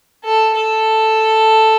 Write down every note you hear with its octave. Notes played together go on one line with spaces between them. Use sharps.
A4
A4